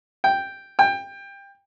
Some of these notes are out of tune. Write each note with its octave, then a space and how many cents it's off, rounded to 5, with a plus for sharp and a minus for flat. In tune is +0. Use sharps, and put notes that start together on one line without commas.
G5 +0
G5 +20